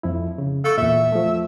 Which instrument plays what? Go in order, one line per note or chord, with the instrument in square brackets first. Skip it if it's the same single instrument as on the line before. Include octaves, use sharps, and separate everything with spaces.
[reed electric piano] F2 F3 E4
C#3
[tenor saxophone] A4 [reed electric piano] F5 C#6
[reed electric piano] E2 A#2 [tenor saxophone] E5
[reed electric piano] F3 A3